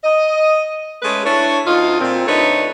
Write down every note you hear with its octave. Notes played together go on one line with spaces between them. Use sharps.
D#5
G#3 A3 C#4 G#4 B4
D4 E4 C#5
D2 D#4 F4
A#2 C4
D3 A3 D#4 B4 C#5